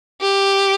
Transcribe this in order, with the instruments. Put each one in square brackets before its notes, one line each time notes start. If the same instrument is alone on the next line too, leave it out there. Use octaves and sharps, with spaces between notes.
[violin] G4